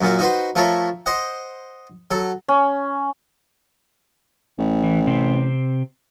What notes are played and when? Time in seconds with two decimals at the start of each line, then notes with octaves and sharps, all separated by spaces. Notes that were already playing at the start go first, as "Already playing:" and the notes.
0.01 F#2 A#2 C#4 F#4
0.19 D#4 F#4 B4 C5
0.56 F3 A3 A4 A#4 C#5 E5
1.06 C5 D#5 F#5
2.11 F#3 A4
2.48 C#4
4.59 A1
4.84 E3
5.07 C3 C4